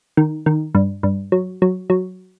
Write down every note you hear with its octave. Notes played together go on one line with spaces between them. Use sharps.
D#3
D#3
G2
G2
F#3
F#3
F#3